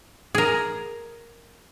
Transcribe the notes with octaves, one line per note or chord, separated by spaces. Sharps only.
G#4 A#4